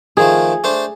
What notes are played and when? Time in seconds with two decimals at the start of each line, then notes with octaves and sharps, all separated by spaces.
0.17 D#3 F3 A3 G#4
0.64 A3 D4 C5